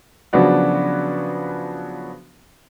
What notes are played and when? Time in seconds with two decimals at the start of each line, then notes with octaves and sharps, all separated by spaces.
0.33 C#3 F3 F#3 B3 D4 F#4